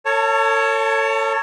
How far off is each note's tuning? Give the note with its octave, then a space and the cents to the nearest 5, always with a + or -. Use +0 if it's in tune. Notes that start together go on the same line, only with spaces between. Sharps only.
A4 +40 C#5 +0 A5 +5